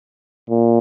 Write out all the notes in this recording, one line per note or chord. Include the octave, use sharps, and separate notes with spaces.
A#2